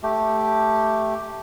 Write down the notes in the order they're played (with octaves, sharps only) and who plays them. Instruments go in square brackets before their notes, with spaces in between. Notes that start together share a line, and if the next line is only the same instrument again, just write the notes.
[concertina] A3 G4